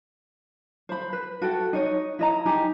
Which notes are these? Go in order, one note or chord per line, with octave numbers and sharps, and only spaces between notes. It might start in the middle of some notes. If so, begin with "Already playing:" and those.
C5 B5
B4
F#4 A4 G5
D#4 C#5 D#5
E4 D#5 A#5
D#4 G4 G#5